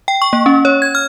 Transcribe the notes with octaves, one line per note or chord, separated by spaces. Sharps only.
G5
C#6
A#3
C#4
C#5
G#6
F6